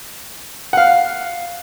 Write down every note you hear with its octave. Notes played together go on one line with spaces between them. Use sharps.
F5 F#5